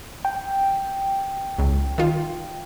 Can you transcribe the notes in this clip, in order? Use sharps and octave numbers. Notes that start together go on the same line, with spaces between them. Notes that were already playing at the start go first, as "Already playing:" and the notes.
G5
C#2
D#3 F4